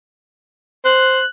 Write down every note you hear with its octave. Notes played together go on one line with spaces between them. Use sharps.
C5 F#6